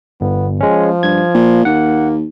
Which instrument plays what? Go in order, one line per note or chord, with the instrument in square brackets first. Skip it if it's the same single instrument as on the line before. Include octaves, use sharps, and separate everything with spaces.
[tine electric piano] G1 [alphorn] B3
[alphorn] F3 [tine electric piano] G#3 C#4
[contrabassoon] G2 [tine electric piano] G#6
[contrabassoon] A#2
[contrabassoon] D#2 [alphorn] A#3 [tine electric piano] F#5